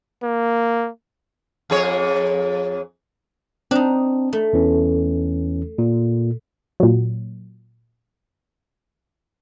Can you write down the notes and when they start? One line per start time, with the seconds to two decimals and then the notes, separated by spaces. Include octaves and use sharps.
0.23 A#3
1.70 F2 G#4 C#5
3.71 C4 D4 D#4
4.33 A3
4.53 E2 E3 C#4
5.78 A#2
6.80 A#2 F#3